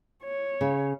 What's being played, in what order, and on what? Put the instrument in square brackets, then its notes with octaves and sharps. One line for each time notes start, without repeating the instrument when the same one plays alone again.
[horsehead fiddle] C#5
[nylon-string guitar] C#3